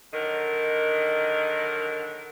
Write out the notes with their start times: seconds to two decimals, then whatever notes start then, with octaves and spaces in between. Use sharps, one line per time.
0.13 D3 D#3 F#3 A#4 D#5